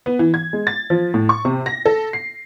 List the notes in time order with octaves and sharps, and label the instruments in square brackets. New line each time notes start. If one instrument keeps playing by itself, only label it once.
[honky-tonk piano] B3
E3
G#6
G#3
A6
F3
A2
C#6
C3
A#6
A4
C7